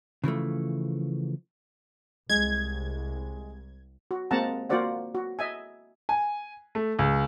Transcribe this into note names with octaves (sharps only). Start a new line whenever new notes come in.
C#3 E3 F3 A3
C2 G#3 G#6
F#4
G#3 A#3 C4 F#5 A5 A#5
A#3 F4 F#4 C5 D5 F#5
F#4
D#5 E5 G#5
G#5
A3
C#2